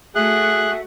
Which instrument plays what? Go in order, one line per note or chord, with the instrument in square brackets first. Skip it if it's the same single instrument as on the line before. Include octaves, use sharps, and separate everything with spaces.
[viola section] A3 F#4 F#5 [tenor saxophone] G#4 [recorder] E5 [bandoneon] F#6